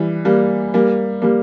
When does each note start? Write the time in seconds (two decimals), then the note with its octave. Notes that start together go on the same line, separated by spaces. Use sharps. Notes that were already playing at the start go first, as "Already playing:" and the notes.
Already playing: E3 G3
0.25 G3 A#3
0.74 G3 A#3
1.22 G3 A#3